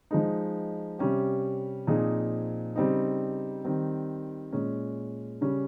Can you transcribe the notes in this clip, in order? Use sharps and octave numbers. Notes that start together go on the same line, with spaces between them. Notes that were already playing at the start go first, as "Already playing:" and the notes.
F3 G#3 D#4
C3 G3 C#4 G4
A#2 F3 C4 D#4 G#4
C#3 G3 C4 D#4
D#3 G3 C4
A#2 G#3 C#4
C#3 G3 C#4